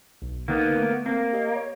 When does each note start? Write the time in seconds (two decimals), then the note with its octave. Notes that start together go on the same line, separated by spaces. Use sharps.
0.22 B1
0.48 D3 A#3 B3 D#4
0.78 A3
1.06 A#3 C4
1.33 G4 D#5
1.56 C#5